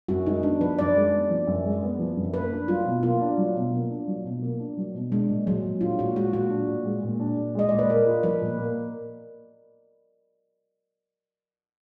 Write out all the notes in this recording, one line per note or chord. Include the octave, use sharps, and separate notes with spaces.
F#2 F#4
G#3 D#4
B3 D4
F3 B4
F#2 D5
G#3
B3
F3
F#2
G#3
B3
F3
F#2
A#3 B4
D4
F#3 F4
B2
A#3 F4
D4
F#3
B2
A#3
D4
F#3
B2
A#3
D4
F#3
B2
G#3 D4
A#2
F#3 G#3
A#2
D4 F4
A#2 F#4
G#3 F#4
A#2 F#4
D4
A#2
G#3
A#2
D4
A#2
G#3 D#5
A#2 D5
B4
A#3 A#4
F4
F3 B4
A#2
A#3